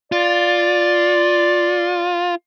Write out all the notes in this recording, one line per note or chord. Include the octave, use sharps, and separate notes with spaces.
F4 D5